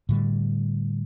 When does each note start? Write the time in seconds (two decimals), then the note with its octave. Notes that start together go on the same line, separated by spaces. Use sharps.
0.09 A2 D3 G3